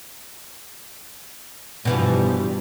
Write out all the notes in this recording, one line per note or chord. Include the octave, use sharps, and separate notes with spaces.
G2 B2 E3 F3 G3